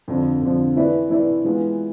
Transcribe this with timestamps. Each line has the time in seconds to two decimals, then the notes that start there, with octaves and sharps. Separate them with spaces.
0.08 F2 D3 F3
0.42 F2 D3 F3
0.76 E3 A3 E4 B4 D5
1.10 E3 A3 E4 B4 D5
1.45 E3 G#3 B3 F4